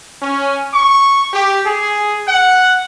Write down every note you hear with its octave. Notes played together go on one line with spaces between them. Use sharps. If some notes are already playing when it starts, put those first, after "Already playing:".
C#4
C#6
G4
G#4
F#5